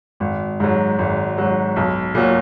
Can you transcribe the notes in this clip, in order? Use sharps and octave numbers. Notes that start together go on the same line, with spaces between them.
G#1
G#2 F#3
G#1
G#2 F#3
B1
A#2 F#3